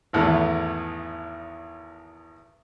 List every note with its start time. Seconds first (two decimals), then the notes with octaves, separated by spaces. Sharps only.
0.13 G#1 E2 A3